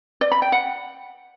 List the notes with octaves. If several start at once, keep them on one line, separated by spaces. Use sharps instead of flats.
D5
B5
G5
F#5